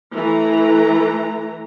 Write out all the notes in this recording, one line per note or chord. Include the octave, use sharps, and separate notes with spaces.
E3 A3 A#5